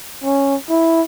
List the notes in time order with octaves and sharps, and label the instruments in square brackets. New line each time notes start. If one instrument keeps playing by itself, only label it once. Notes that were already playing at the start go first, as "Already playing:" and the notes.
[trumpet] C#4
E4